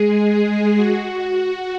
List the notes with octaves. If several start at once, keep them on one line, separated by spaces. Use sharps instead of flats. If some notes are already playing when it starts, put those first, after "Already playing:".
Already playing: G#3 G#4
G#3 G#4
F#4